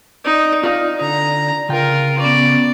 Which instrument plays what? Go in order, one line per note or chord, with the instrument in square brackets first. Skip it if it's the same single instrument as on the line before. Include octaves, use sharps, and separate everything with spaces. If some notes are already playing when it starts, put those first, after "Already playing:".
[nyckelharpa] D#4 [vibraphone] D5
[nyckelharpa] D#4 [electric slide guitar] F4 F5
[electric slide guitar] D3 [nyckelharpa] A#5
[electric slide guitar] C#3 G5 [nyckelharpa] F4 A#4
[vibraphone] B3 C#4 [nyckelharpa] D5